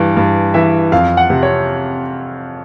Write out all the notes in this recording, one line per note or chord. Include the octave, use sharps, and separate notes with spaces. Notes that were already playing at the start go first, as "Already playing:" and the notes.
Already playing: G2 E3
G2
E3 E5
F2 F5
F#5
C3
C#5